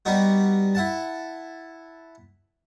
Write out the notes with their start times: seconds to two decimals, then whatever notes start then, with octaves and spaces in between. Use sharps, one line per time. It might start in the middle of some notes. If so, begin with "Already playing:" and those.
0.05 G3 B3 D#4 F#4
0.75 E4 F#5 A5